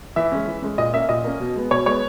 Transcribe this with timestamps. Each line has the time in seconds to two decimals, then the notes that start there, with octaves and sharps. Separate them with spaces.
0.16 E3 E5
0.32 G#3 C#4
0.47 E3
0.62 G#3 C#4
0.78 A#2 D#5
0.93 A#3 C#4 E5
1.09 A#2 D#5
1.24 A#3 C#4
1.40 B2
1.56 G#3 B3
1.71 B2 C#5
1.86 G#3 B3 C#5